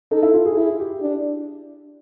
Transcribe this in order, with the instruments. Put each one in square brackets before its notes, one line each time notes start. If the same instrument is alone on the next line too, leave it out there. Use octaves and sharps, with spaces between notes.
[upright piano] D#4 [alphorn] A4
[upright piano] E4
F4
G#4
[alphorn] E4 [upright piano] G#4
[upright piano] G4
[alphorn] D4